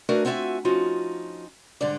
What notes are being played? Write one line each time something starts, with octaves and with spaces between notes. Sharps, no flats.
A3 D4 F#4 A#4 B4 G#5
B3 C4 F4 F#4 E5 G#5
F3 C#4 D#4 F4 F#4
G#2 D3 G3 D4 A4 D5